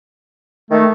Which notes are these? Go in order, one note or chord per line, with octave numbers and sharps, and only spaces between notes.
D#3 A3